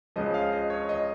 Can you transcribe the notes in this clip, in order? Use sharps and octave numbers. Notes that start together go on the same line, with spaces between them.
C#2 C#3 F3 D#5
F5
D#5
C#5
D#5